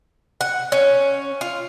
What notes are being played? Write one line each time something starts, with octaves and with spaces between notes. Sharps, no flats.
F#5
C#4
F4